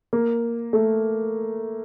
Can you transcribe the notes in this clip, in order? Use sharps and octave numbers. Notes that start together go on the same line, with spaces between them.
A#3
A3